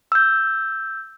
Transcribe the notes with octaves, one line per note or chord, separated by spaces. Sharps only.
E6 G6